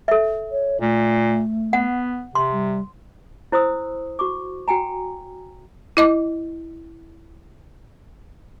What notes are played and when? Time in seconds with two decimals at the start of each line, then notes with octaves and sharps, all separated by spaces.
0.08 A4 E5
0.51 C#5
0.81 A#2 A3
1.73 B3 F#5
2.35 C3 C6
2.52 G3
3.52 E4 C5 C6 D#6 E6
4.19 F#4 C#6 D6
4.68 F#4 G5 G#5 A#5
5.97 E4 D#5 D6